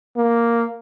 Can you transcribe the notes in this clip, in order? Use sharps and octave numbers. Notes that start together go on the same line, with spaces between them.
A#3